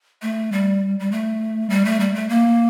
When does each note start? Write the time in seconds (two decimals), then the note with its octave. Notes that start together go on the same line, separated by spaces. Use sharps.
0.22 A3
0.52 G3
1.00 G3
1.12 A3
1.70 G3
1.85 A3
2.00 G3
2.15 A3
2.29 A#3